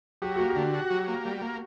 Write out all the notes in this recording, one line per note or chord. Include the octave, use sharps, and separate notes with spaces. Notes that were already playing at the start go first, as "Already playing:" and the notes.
F#3 G4
A#3 F#4
G4
D3
F#4
F#3
A#3
G3
A#3